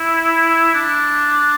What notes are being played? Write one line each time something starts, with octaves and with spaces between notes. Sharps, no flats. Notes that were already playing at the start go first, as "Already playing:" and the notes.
Already playing: E4
D4